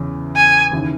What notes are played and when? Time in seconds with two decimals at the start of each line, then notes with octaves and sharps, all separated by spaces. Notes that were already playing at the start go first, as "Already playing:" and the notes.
Already playing: E2 C#3 E3
0.36 G#5
0.71 D#2 C#3 E3